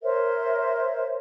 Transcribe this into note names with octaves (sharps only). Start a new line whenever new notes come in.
A#4 C5 C#5 E5